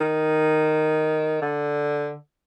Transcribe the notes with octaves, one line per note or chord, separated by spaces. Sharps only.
D#3
D3